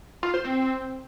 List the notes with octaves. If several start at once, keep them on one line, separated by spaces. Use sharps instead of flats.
F4
C5
C4